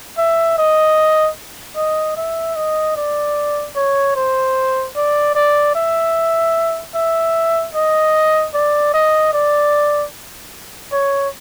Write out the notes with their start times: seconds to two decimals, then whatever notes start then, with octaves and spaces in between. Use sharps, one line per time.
0.18 E5
0.58 D#5
1.76 D#5
2.17 E5
2.56 D#5
2.96 D5
3.76 C#5
4.16 C5
4.96 D5
5.35 D5
5.75 E5
6.95 E5
7.75 D#5
8.54 D5
8.94 D#5
9.33 D5
10.92 C#5